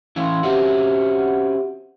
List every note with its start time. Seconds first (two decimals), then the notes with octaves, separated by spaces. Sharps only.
0.16 E3 C#4 E4 F5 C6
0.43 C4 C#4 F#4 G4 E5 F#5